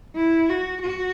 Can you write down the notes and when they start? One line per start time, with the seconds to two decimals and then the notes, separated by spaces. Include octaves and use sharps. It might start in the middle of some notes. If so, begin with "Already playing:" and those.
0.16 E4
0.49 F#4
0.82 F#4